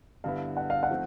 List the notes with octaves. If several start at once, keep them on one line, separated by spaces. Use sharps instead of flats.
G2 D3 G3 B3 E4 F5
F#5
F5
F#5
F3 A3 C4 D#4